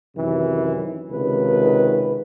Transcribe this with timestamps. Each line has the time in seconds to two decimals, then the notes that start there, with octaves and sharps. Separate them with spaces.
0.16 F#2 C3 D#3 E3
1.10 C#2 C3 D#3 B4